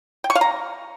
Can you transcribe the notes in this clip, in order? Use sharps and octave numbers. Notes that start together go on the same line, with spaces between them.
G5
C#6
F5
A#5